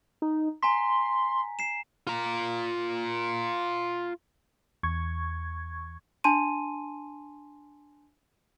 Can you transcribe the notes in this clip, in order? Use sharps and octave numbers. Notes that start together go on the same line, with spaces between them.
D#4
G#5 A#5 C6 B6
C7 E7
F4 A#5
E2 C#6 G#6
D4 G#5 A5 C6 D#7